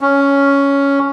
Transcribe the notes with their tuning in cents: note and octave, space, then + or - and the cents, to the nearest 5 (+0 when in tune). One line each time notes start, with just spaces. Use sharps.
C#4 +5